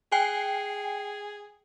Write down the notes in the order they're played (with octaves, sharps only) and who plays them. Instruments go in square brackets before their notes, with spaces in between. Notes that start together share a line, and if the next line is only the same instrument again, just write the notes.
[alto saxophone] G#4 [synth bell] G5 G#5 C7